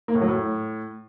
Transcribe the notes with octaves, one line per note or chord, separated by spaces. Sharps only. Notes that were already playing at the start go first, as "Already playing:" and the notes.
A#3
A2
F#3
A2